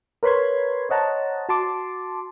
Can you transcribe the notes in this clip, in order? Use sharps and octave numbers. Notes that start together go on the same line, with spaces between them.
A#4 B4 C#5 B5 C6 G#6
C5 C#5 D#5 F#5 A5 A#5
F#4 A5 C6 D6